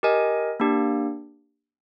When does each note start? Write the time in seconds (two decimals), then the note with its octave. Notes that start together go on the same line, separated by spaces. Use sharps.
0.03 G4 A#4 D#5 G#5
0.60 A#3 D4 G4